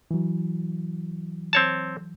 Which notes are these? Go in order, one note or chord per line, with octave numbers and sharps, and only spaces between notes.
E3 F#3
C4 C#5 A5